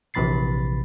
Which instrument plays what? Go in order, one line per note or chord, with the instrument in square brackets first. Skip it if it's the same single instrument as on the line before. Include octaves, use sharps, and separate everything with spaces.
[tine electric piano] A#1 C3 E3 B5 A6 C7